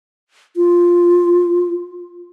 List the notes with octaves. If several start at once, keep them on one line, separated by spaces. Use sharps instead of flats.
F4